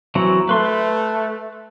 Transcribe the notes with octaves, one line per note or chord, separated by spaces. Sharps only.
E3 F#3 C4
A3 B4 C6